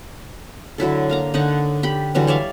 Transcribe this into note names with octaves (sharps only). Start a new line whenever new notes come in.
D3 F#3 E4 A4
A#3 F5 A#5
D3 D#4 C#5 F#5
G4 G5 B5
D3 E3 F#3 G3
C#5 D5 E5 F5